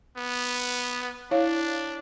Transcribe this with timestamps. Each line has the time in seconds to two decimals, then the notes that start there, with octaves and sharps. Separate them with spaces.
0.17 B3
1.31 D4 E4 C#5 F5